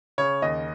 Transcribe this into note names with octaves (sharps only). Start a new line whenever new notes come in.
C#3 C#5
D#2 D#5